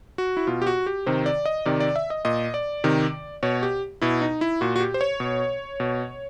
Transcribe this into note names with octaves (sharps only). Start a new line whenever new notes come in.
F#4
E4
B2 F4
G4
F#4
G4
C3 D#3 C5
D5
D#5
C3 D#3 D5
D5
E5
D#5
A#2 D#5
D5
C3 D#3
B2 C#5
G4
B2 E4
D#4
E4
A#2 F#4
F#4
G4
C5
C#5
B2
B2